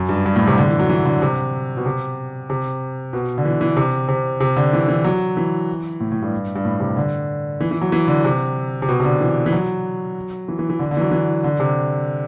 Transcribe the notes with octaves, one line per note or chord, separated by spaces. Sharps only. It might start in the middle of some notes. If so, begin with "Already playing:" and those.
Already playing: F#2
G2
G2
A2
C3
D3
E3
F#3
E3
D3
C3
B2
C3
C3
B2
D3
E3
E3
C3
C3
C3
D3
E3
E3
F#3
E3
A2
A2
G2
G2
A2
C3
D3
E3
E3
F#3
E3
D3
C3
C3
B2
C3
D3
E3
E3
F#3
E3
E3
E3
D3
D3
E3
F#3
E3
D3
C3